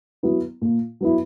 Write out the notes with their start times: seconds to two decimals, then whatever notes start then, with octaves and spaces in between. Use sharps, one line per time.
0.23 F#3 B3 E4
0.62 A#2
1.01 F#3 B3 E4